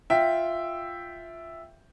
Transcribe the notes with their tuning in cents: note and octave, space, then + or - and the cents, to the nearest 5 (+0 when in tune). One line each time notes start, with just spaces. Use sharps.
F4 +0 E5 +0 G5 +0